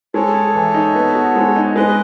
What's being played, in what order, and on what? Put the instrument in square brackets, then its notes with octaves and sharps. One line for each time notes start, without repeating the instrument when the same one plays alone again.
[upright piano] G#3 [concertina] A4 C#5
[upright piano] G#4
E3
D#4
B3
F#4
G#3
D#4
[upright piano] G#3 [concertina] B4 D#5